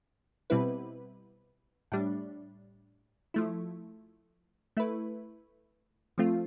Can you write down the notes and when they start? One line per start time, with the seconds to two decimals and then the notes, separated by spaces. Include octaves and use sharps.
0.50 B2 G3 C4 E4 B4
1.92 A2 G3 D4
3.34 F3 A3 E4
4.77 A3 E4 B4
6.18 F3 A3 C4 F4